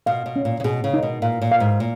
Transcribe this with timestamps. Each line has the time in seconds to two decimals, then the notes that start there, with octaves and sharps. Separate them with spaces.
0.06 B2 F5
0.26 B2
0.36 C#4
0.45 A#2
0.60 C#3
0.64 B2 G#4
0.84 C#3
0.94 D#4
1.03 B2
1.22 A#2 F5
1.42 A#2
1.52 F5
1.60 G#2
1.80 A#2